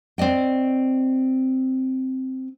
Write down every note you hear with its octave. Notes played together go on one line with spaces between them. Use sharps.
C4 D5 D#5 G5